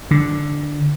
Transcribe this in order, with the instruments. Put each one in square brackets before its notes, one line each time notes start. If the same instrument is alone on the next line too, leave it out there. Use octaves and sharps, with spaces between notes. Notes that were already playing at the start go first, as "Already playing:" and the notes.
[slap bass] D3